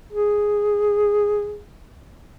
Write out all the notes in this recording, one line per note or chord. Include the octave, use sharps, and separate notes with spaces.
G#4